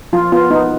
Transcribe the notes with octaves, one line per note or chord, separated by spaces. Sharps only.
F3 F4
B3 F4
B3 D#4